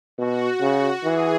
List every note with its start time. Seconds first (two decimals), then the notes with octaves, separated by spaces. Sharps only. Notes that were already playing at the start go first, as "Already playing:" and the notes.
0.18 B2 F#4
0.61 C#3
1.04 E3 G#4